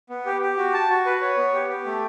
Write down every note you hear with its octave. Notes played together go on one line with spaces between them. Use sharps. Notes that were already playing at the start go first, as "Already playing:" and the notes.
B3
G4
G4
F#4
A5
F#4
B4
C#5
B3
G4
G4
A3